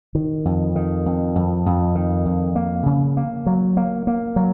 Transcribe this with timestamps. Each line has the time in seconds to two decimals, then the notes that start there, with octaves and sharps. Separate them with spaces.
0.15 D#3
0.45 F2
0.76 D#3
1.06 F2
1.36 F2
1.66 F2
1.95 D#3
2.25 F2
2.56 A#3
2.86 C#3
3.17 A#3
3.46 F#3
3.77 A#3
4.07 A#3
4.36 F#3